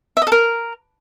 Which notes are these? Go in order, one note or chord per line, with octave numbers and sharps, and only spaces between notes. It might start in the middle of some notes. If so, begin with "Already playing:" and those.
E5
D#5
A4
A#4